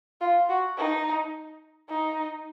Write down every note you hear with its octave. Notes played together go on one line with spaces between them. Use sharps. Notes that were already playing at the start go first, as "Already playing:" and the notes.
F4
F#4
D#4
D#4